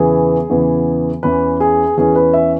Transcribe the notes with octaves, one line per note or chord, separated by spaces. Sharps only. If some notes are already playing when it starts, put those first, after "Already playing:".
Already playing: E2 C#3 E3 B3 G#4
E2 C#3 E3 B3
E2 E3 C#4 B4
G#4
E2 E3 C#4 G#4
B4
E5